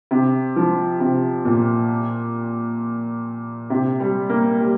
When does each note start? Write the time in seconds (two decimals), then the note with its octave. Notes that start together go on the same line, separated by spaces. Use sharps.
0.11 C3
0.56 F3
1.00 C3
1.45 A#2
3.70 C3
4.00 G3
4.29 A#3
4.60 G3